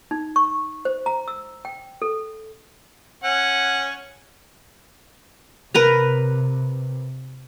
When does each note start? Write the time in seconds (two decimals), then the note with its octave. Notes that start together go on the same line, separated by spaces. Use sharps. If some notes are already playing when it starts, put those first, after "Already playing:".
0.11 D#4
0.36 C#6
0.85 C5
1.06 A#5
1.28 E6
1.65 G5
2.02 A4
3.24 C#4 F#5
5.74 C3 A#4 B4 A#5